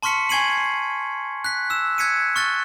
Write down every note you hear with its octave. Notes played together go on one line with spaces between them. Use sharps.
A5 C6 C#6 F6 B6 C#7
G#5 C#6 G#6 C7 D#7 F#7
F#6 B6
E6 E7
F#6 G#6 B6 C#7 D#7
C#6 F6 F#6 A6 G7